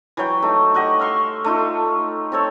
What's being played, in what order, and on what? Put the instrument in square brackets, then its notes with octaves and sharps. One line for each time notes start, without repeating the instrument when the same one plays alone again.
[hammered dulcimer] E3 F#3 C#5 G5
A3 D#4
G4 D#5 F#5 C#6
E5 F5 C6 C#6
A3 D#4 F4
C4 A4 C#5